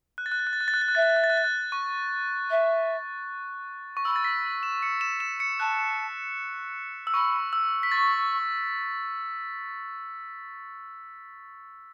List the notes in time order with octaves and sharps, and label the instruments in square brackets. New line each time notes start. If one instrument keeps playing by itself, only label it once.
[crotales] F#6
A6
F#6
A6
F#6
A6
F#6
A6
F#6
A6
F#6
[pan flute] E5 [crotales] A6
[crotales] F#6
A6
F#6
A6
F#6
A6
F#6
C#6
[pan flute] E5
[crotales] C#6
[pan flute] B5 [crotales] E6
[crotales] A6
B6
E7
C#7
E7
E7
C#7
[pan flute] A5 [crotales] F#6
[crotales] E6
[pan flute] B5 [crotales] C#6
[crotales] E6
B6
[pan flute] C#6 [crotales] A6